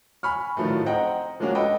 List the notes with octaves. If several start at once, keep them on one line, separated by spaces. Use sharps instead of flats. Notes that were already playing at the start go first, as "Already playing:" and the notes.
G#5 B5 C#6 F6
A2 D#3 F3 F#3 A3
C4 D#5 F#5 G5 A#5
F3 G#3 A#3 C#4 D4 F#4
A4 B4 D#5 G5